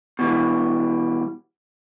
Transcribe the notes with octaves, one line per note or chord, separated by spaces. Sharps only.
B2 E3 G3